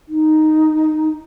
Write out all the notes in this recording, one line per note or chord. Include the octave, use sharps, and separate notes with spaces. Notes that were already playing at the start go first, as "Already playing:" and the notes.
D#4